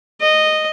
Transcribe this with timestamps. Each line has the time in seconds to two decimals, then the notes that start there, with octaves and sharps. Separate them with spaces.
0.21 D#5